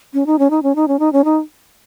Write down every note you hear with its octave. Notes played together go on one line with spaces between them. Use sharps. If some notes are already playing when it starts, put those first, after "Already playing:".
C#4
D#4
C#4
D#4
C#4
D#4
C#4
D#4
C#4
D#4